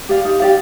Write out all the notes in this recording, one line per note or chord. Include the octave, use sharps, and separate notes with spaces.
G4 D5 F5
D#4
G4 D5 F5